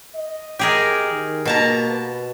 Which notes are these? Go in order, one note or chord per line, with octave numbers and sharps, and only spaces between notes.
D#5
G4 G#4 A#4
D#3
B2 A#3 A5 A#5
B4